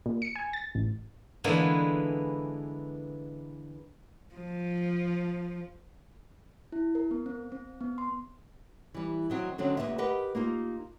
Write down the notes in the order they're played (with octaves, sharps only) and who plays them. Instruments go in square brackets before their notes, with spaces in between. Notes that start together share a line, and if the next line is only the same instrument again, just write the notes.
[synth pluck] A#2
C#7
G#5
A6
A1
[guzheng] D3 E3 G#3 A#3 B3 E4
[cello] F3
[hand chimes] E4
A#4
B3
C4
C4
B3
C6
[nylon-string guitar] E3 G3
D#3 F#3 C4
D3 D#3 F#3 C4 C#4
D2 A#2 G#3 B3 G4 E5
G4 A#4 B4 D#5 F#5
A#3 D#4 F4 G4